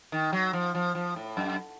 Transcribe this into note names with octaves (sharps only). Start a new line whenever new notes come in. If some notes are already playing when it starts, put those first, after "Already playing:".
D#3
F#3
F3
F3
F3
A2
F#2